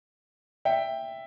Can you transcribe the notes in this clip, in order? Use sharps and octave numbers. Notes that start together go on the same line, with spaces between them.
E5 G5